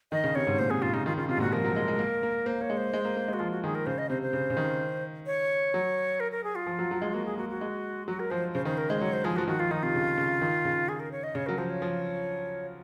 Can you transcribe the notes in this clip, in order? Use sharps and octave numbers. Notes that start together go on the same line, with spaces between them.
D#3 D#5
C#3
C3 C#5
G#2
A#2 C5
C3 G#4
C#3 F4
C#3 D#4
D#3 F4
C#3 F4
C3 F4
G#2
A#2 F#4
F3 A#4
F#3
G#3
G#3
A#3
A#3
A#3 C5
A#3 C#5
G#3
C5
G#3
A#3
A#3
G#3
F#4
F3 F4
F#4
D#3 G#4
A#4
C#3 C5
D#5
C3 C5
C5
C#3
C#3
D#3
C#5
F#3
A#4
A#4
G#4
F4
F3
F#3
F#3
G#3
A#3 F#4
G#4
A#3 F#4
F#4
G#3
F#3 F#4
A#4
F3 C5
C#3 C5
D#3 C5
A#4
G#3 C5
F#3 C#5
C5
F3 G#4
F3 F#4
D#3 F#4
F3 F4
D#3 D#4
C3 F4
C#3
C#3
D#3
C#3
G#4
A#4
C#5
D#5
C#3 C#5
F#3 A#4
F3 C5
C#5
F3